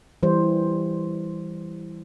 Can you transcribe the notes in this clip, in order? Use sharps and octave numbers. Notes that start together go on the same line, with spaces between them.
E3 G3 C5